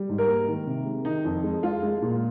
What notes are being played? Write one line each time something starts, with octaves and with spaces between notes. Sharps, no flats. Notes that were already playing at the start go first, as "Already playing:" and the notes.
Already playing: G3
G#2
A#4
A#3
D#3
C3
G#3
D#3 D#4
F2
G#3
G#3 F4
G#3
A#2